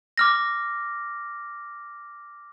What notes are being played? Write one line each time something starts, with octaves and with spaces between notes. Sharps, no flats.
D6 F6 A#6